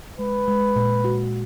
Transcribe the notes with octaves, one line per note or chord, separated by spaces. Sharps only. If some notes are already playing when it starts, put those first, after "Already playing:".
G#3 B4
G#3
A#2
F#4